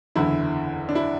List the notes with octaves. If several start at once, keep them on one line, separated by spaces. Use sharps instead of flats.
F#1 E2 D3 E4
D4
E4